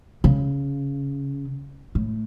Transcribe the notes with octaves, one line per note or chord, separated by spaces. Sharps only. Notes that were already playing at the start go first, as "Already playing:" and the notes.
C#3
A2